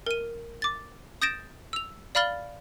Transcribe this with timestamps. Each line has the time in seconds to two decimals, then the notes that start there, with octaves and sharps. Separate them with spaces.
0.06 A#4 D#7
0.62 D6 A6
1.22 D#6 G6 A6 A#6 D7 E7
1.73 E6 F7
2.15 D5 F5 B5 F6 A6 G7